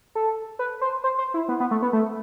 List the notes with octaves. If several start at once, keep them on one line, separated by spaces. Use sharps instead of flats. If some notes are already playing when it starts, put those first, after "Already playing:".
A4
B4
C5
C5
C5
E4
B3
B3
A3
B3
A3